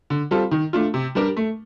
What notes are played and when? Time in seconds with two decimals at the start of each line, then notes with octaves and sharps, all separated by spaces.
0.10 D3
0.31 G3 C4 F4 A4
0.51 D#3
0.73 A3 D4 F4
0.94 C3
1.15 G3 D4 G4 A#4
1.37 A3